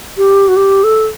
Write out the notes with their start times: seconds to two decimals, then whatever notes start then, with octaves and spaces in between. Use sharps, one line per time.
0.17 G4
0.48 F#4
0.56 G4
0.84 A4